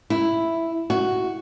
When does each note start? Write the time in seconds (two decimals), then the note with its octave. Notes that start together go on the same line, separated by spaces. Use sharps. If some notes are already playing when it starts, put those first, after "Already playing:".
0.10 E4
0.90 F#4